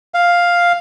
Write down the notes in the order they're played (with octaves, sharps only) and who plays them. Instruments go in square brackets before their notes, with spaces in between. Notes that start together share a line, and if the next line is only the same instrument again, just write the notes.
[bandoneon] F5